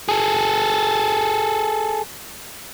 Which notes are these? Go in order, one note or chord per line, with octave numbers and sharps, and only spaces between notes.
G#4 A4